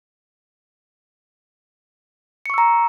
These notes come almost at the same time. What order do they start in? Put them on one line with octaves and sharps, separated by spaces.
C#7 C#6 E6 A#5